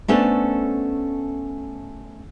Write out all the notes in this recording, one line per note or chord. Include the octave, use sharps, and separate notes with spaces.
A3 B3 C#4 D4 A4 C5